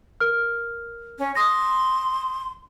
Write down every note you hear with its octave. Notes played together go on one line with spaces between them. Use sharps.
A#4 F6
C#4
C6 D#6 A#6